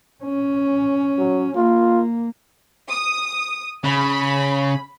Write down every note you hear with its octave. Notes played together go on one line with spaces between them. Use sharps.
C#4
F#3
A#3 F4
D#6
C#3 B5